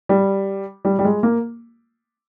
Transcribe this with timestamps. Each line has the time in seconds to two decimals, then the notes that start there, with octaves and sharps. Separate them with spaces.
0.09 G3
0.85 G3
0.99 G3
1.04 G#3
1.23 A#3